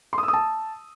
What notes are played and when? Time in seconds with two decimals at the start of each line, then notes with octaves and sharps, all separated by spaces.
0.13 C6
0.18 D#6
0.23 E6
0.28 D#6
0.33 A5